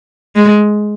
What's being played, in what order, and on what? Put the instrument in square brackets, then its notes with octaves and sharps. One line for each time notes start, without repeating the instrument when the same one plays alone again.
[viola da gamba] G#3